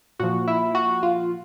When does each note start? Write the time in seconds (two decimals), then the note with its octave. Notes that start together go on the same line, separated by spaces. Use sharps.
0.19 A#2 F3 F#4
0.48 E4
0.75 F#4
1.03 F4